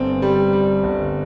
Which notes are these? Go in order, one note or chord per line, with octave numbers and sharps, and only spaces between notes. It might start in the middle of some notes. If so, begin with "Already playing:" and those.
Already playing: G1 C4
G3
G3
G1